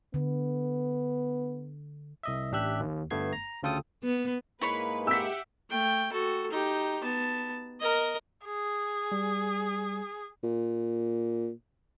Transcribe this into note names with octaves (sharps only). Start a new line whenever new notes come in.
D3 B3
C2 D#5 E5
A1 D4 G4 E5 F#6
D#2
G1 G2 A3 B3 G#6 C7
A#5
D2 C#3 F4 A4 G5 D#6
B3
G#2 G#3 A#3 E4 B4 C#5 B5
G4 E5 F#5 E6 B6
A3 G5
F#4 A4
D#4 G4
B3 A5
A#4 D#5
G#4
G3
A#2